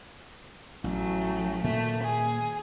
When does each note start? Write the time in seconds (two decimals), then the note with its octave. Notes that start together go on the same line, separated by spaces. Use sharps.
0.84 A1 F#3 A3
1.64 A#2 D#3 A3 A#3
2.02 G#4